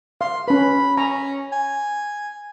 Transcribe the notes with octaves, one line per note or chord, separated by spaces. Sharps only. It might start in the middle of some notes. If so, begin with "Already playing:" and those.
F5 C6
C#4 B4 B5
C#4 A#5
G#5